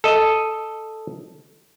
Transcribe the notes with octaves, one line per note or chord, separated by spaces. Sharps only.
A4 D#5